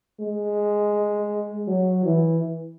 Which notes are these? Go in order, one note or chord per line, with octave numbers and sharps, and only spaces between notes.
G#3
F#3
E3